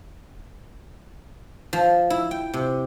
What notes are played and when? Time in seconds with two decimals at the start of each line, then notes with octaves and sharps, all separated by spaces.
1.73 F3
2.10 E4
2.31 G5
2.54 C3